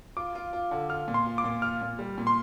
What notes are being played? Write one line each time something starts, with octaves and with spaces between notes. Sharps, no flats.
F4 D6
F4
F4
D3
F4 F6
A#2
C6
F4
D6
A#2
F4 F6
A#2
G3
A#2
C6